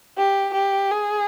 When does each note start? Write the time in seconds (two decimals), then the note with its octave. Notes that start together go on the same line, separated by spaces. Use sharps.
0.18 G4
0.54 G4
0.91 G#4